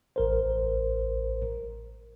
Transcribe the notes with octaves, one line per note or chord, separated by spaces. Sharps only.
A1 A#4 C5